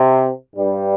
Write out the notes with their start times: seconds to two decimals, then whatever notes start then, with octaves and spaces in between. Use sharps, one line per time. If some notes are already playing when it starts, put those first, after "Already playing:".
Already playing: C3
0.56 G2 G3